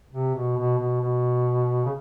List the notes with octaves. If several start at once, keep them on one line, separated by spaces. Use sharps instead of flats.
C3
B2
B2
B2
B2
C#3